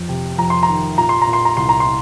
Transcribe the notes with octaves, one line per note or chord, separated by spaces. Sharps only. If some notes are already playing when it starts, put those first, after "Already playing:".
Already playing: F2
C3
F2 A#5
C6
A#5
D#3
A#2 A#5
C6
A#5
A#2
C6
A#5
C2 C6
A#5
C6